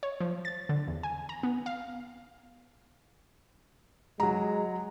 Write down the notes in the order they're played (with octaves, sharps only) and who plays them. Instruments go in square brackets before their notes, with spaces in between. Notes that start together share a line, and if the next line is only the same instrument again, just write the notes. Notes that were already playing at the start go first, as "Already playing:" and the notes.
[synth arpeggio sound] C#5
F3
A6
D3
E2
G#5
A#5
B3
F5
[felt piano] F#3 A#5 [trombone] G#3